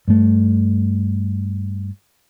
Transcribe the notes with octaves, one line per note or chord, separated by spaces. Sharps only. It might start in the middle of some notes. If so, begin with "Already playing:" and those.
G2 A3